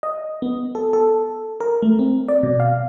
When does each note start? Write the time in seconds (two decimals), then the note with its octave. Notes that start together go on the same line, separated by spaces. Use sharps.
0.03 D#5
0.42 B3
0.75 A4
0.93 A4
1.60 A#4
1.82 A3
1.99 C4
2.28 D5
2.43 B2
2.60 F5